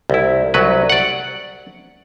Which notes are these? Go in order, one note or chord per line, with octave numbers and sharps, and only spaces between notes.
C2 E4
C2 F#3 B4
D5 F#5